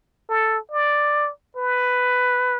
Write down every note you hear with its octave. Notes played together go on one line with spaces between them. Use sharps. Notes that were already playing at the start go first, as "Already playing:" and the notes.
A4
D5
B4